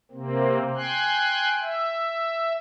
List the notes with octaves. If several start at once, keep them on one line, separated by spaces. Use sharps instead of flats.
C3 A#3 C4
G5 G#5 C6 F#6
E5